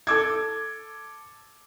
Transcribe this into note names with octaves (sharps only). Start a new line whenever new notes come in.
A4 D6 G#6